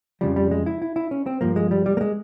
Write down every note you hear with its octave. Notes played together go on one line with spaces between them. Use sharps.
F2 C#3 F3 G3
G3
G#3
E4
E4
E4
C#4
C4
G2 F3 A#3
G#3
G3
G3
A#3
G#3